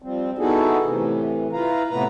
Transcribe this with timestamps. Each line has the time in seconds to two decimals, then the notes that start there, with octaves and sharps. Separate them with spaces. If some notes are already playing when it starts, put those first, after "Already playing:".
0.02 F3 G3 C4
0.38 B3 D#4 E4 F#4 G#4 A4
0.83 A2 C3 E3
1.53 E4 F4 B4 F5 A#5
1.91 A2 C3 A3 B3 B4 A#5